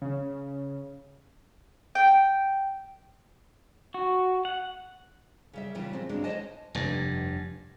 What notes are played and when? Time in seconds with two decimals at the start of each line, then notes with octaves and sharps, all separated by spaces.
0.02 C#3
1.95 G5
3.94 F#4
4.45 F#5
5.53 C#3 G3 E5
5.75 A#2 C#3 E3 F3 G3
5.93 G#3 C4
6.09 G2 C#3 F3 F#3 G#3 D4
6.24 D2 C#3 C5 C#5 D#5 A5
6.75 F1 G2